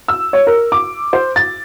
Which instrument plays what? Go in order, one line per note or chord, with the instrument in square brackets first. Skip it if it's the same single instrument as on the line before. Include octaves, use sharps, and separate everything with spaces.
[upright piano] E6
C#5
A#4
D6
C5
A6